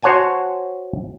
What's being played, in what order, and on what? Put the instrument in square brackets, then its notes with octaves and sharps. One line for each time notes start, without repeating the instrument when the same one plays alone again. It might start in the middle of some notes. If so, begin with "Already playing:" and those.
[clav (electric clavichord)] F#4 C5 C#5 F#5 G#5 A5